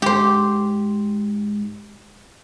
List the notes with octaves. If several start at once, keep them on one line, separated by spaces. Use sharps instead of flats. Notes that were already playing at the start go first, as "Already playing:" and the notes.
G#2 G4 C5